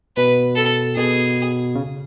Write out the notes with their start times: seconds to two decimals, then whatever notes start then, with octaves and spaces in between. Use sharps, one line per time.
0.17 B2 B4
0.56 A4
0.96 B2 G#4
1.75 C#3